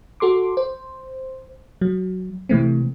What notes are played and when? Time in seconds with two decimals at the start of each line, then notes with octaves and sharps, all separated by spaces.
0.20 F#4 A4 C6 D6
0.57 C5
1.81 F#3
2.49 C3 E3 A3 C4